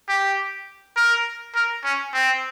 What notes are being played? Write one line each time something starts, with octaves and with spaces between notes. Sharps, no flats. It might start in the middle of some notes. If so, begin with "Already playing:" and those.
G4
A#4
A#4
C#4
C4